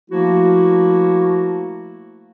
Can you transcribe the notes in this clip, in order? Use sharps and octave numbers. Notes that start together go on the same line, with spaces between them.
F3 A3 A#3 E4 F#4